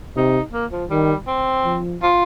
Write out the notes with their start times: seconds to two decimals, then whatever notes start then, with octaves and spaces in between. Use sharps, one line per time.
0.16 C3 D#4
0.53 A#3
0.72 F3
0.90 D#3 G3
1.27 C4
1.64 F3
2.02 F4